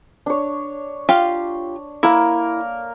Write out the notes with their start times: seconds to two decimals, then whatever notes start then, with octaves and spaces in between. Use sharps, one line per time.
0.26 D4 C#5
1.09 F4 G4 F5
2.03 A#3 E4 A#4